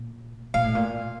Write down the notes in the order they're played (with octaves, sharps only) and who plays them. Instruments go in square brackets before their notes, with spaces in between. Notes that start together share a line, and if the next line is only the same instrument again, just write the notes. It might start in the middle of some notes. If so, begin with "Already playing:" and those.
Already playing: [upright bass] A#2
[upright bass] A#2 [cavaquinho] F5
[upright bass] A2
A#2